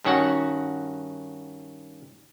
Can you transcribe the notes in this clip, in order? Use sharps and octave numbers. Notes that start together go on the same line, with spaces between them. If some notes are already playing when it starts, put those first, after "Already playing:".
G2 D#3 C#4 F#4 F#5